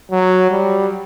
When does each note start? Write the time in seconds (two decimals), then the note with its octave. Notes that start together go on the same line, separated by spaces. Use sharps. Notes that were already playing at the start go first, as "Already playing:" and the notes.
0.12 F#3
0.51 G3